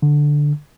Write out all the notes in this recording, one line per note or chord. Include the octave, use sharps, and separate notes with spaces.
D3